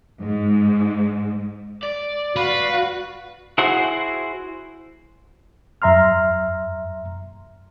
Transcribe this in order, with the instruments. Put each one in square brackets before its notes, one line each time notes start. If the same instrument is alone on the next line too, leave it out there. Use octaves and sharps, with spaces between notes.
[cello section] G#2
[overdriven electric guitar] D5
[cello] F#4 [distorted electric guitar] B4 [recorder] F5
[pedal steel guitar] E4 F#4 G#4 C5 F#5
[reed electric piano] F#2 E5 A#5 C6 F6